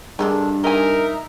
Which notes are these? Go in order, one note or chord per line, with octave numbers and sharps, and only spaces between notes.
G2 G#3 D4 A4 A#4
D#4 A#4 D#5 E5 G#5